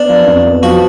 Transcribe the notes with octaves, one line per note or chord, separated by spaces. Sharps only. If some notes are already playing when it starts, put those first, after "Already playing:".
Already playing: B3 D4
F3
F2
B3
F3 F#4